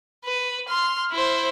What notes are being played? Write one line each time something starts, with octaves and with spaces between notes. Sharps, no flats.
B4
C6 F6
E4 C5